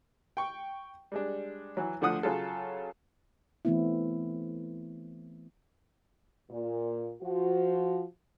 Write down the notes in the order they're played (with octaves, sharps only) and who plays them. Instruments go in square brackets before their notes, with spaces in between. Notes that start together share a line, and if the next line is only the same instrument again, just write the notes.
[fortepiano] G5 C#6
G3 G#3 D4
E3 F#3
D2 D3 F3 F#5 D#6 F#6
C#3 F#3 F4 G#4 A4
[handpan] E3 A3 B3 C4 E4
[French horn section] A#2
F3 F#4